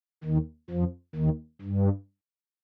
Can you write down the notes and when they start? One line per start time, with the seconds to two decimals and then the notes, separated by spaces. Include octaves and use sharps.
0.24 D#2 D#3
0.70 F2 F3
1.16 D#2 D#3
1.62 G2